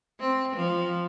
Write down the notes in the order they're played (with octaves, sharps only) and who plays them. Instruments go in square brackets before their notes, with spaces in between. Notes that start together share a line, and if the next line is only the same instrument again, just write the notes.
[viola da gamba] C4
F3